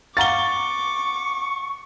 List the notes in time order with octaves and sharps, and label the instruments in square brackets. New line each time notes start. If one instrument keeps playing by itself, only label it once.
[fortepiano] F5 F#5 A#5 [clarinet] C#6 [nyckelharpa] D6 [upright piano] A6 G7